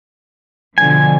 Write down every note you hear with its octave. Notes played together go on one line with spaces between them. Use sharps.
B2 D3 F3 G#5